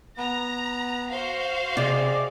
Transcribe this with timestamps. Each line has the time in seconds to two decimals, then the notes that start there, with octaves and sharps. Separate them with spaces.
0.18 B3 A#5
1.12 F#4 C5 F5
1.77 C3 G#4 D5 D#5 D6